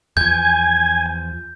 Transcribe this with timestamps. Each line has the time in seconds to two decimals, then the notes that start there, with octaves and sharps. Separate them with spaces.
0.17 E2 F3 G#5 G6